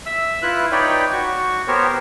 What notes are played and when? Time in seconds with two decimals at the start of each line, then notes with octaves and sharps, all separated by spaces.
0.06 E5 E6
0.43 E4 F4 B4 F#6
0.72 D#4 B4 C#5 D5 G5
1.13 F#4 C#6
1.68 B3 G4 A#4 C5 C#5